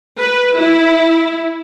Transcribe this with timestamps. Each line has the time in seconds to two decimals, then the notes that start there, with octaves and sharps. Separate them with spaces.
0.18 B4
0.56 E4